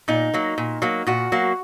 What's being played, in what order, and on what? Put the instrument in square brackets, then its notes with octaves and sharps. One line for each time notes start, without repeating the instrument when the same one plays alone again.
[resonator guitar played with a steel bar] A#2 D#4
F#3 A#3
A#2
F#3 A#3
A#2 F#4
F#3 A#3